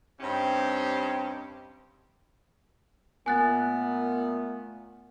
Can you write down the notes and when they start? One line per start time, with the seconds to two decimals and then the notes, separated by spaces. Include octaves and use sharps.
0.20 G2 C4 C#4 D#4 G4
3.26 A#2 A3 B3 G#5 F#6 A6